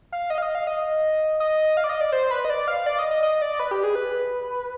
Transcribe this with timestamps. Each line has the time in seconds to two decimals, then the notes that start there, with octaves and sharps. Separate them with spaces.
0.12 F5
0.30 D#5
0.38 F5
0.42 D#5
0.55 F5
0.67 D#5
1.40 D#5
1.77 F5
1.84 D5
1.89 D#5
2.01 D5
2.12 C5
2.31 B4
2.45 D#5
2.50 D5
2.68 F5
2.86 D5
2.99 D#5
3.11 D#5
3.23 D#5
3.42 D5
3.60 B4
3.71 G4
3.84 G#4
3.95 B4